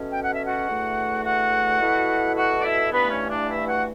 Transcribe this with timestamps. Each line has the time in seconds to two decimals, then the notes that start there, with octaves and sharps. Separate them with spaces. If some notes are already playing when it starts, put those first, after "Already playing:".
Already playing: B2 A3 C#4
0.11 G5
0.22 F#5
0.33 E5
0.44 F#4 F#5
0.68 E2 D3 A3
1.23 F#4 F#5
1.80 B2 A3 E4
2.36 F#4 F#5
2.57 D5
2.64 E4 E5
2.92 G2 E3 A3 B3 B4
3.10 C#4 C#5
3.29 D4 D5
3.48 E4 E5
3.66 F#4 F#5